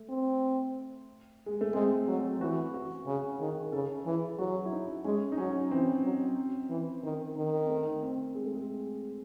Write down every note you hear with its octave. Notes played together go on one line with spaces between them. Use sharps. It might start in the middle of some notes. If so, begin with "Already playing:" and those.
Already playing: A3
C4
G#3
A3
G#3 C4
F#3
E3 F#4
F#4
C#3 G#4
D#3 G#4
C#3 A4
E3 G#4
F#3 F#4
E4
D#4
G#3 C#4
D#4
F#3 C#4
E3 C4
F#3
E3
D#3
D#3
C4
A3
C4
G#3
A3
G#3